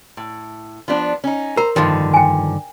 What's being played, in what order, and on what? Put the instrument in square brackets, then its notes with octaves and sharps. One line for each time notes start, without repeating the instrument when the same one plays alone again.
[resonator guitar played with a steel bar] A2
F3 B3 D4
C#4 D#4
[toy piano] A#4 [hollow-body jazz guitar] C5 [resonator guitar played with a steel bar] A#5
[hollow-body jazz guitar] G2 D3 D#3 [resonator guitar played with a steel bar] F3
[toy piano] G5 G#5